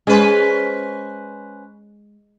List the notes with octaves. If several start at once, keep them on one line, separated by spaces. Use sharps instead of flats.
G#3 C#4 B4 C5